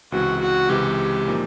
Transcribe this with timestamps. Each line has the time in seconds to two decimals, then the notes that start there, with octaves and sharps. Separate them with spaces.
0.12 C#2 C3 E3 G#3 F#4
0.41 F#4
0.69 C#2 C3 E3 G#3 G4
1.27 A#2 F3 A#3 D#4